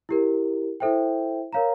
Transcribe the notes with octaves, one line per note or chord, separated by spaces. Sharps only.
E4 G4 A#4
E4 A4 C5 E5 G5
A#4 C#5 F5 A#5